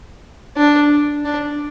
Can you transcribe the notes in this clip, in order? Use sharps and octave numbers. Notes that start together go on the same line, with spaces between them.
D4
D4